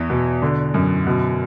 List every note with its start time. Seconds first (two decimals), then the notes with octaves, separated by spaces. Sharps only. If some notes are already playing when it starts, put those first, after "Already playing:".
Already playing: E2 E3
0.10 B2
0.42 D3
0.74 F#2
1.07 B2